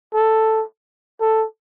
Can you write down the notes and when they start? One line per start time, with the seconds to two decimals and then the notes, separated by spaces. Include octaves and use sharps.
0.14 A4
1.21 A4